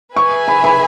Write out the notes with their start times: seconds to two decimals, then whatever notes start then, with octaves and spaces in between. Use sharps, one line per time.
0.16 G#4 B4 E5 G#5 C#6
0.48 B5
0.64 B5